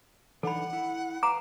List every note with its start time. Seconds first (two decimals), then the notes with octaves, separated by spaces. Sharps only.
0.43 E3 D4 D#4 A4 F#5 B5
0.73 E4
1.23 B4 F5 A#5 D6